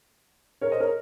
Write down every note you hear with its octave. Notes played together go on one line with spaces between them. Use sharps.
A#4 C#5
C5 D#5
A#4 C#5